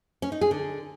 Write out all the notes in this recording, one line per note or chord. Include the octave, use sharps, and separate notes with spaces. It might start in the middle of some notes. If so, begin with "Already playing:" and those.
C#4
D#4
G#4
D3